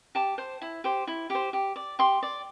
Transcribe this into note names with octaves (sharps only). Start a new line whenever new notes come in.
G4 A5
C5
E4
G4 C5
E4
G4 C5
G4
D5
G4 C6
D5